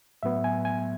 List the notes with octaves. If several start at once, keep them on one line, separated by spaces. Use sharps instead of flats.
A2 F#3 B3 E5
G#5
G#5